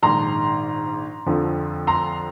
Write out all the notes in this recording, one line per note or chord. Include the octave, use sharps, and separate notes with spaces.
A#1 G#2 D#3 A#5 C6
F2 D3 F3
A#5 C6